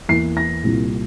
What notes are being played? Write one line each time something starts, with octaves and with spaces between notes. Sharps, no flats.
E2 E3 A#3 C7
A#6
C2 A#2 G3